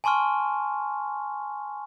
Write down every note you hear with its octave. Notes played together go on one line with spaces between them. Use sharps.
G#5 A5 C6 C#6 F6